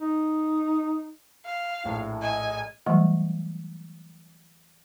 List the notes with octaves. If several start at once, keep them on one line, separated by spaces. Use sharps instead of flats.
D#4
F5
A#1 A2 E4
D#5 G#5
E3 F#3 G3 A3